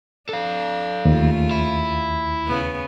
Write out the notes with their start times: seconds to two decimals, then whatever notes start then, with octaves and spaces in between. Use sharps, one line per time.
0.29 D4 A4 F5
1.05 D#2 C#3 A3 F4
1.51 E4
2.47 C#3 B3